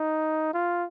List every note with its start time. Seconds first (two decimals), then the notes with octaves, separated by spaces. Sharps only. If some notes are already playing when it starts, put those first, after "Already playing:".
Already playing: D#4
0.54 F4